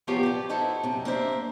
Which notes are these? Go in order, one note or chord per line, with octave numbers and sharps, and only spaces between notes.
C3 F3 B3 C#4 F4 G4
G4 D5
D#4 E4 F#4 A4 C5
F#2 C3
A#3 D4 C5 E5